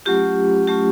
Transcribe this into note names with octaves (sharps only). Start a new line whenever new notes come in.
F#3 A3 C#4 F4 G4
F#3 A3 C#4 F4 G4